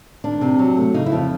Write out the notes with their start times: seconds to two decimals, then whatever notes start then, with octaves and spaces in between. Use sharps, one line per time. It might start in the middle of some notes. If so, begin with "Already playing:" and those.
0.24 D#3 D4
0.41 C3
0.59 F#3
0.77 A3
0.94 C#3 D#4
1.06 E4
1.12 F2